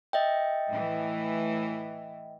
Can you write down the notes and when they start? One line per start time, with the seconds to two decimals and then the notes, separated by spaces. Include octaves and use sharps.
0.13 D#5 E5 G5
0.69 A2 E3